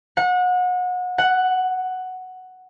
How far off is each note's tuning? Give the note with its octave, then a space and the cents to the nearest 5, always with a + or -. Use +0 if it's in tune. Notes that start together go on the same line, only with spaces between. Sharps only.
F#5 -30
F#5 +5